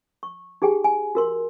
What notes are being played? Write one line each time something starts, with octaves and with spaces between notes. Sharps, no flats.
C#6
D#4 G4 G#4 G5 G#5
G#5
F#4 A#4 C6